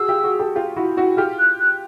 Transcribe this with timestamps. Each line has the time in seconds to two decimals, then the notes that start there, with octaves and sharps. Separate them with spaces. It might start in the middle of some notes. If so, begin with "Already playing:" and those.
Already playing: F#4 G#4 E6
0.09 F4 G4
0.24 F#4 G#4
0.39 G4 A4
0.56 F4 G4
0.76 E4 F#4
0.97 E4 F#4
1.17 F4 G4 F6
1.38 F#6
1.60 F#6